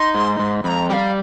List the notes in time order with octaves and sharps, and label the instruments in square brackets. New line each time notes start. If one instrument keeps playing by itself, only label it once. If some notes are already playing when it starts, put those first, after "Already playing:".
Already playing: [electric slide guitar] D#4 [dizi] C6
[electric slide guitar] G#2
G#2
[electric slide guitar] F2 [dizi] A#5 B5
[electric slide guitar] G3 [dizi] G5
[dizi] F5